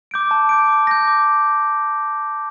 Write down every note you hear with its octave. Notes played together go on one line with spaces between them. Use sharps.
D6 G6 D7
A5
D6 G6 D7
D6
G6 A#6
D6